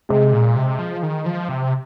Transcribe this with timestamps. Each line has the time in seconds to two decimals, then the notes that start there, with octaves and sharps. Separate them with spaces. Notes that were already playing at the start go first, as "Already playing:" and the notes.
0.09 C3 G#3
0.33 A#2
0.56 C3
0.79 F3
1.03 D#3
1.26 F3
1.49 C3